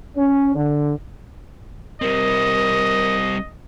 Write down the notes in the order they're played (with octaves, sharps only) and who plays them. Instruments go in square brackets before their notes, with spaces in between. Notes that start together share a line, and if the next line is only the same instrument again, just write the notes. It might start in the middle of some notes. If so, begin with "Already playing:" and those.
[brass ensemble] C#4
D3
[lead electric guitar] G3 C4 [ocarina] A#4 [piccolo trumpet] D#5